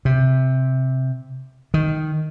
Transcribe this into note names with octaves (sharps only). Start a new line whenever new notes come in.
C3
D#3